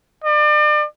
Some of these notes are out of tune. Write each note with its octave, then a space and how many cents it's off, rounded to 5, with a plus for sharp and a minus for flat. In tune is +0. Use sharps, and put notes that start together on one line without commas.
D5 +35